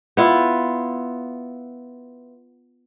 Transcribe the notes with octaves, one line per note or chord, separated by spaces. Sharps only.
B3 E4 F4